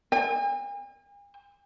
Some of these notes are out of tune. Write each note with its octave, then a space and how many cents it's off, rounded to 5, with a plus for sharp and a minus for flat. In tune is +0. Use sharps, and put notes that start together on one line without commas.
G#5 -45